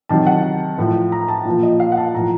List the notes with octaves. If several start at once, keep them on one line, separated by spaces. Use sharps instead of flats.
C3 D#3 F#3 A5
F#5
A2 F3
A#5
A5
A#2 F3
D#5
F5
F#5
A5
A2 F3 A#5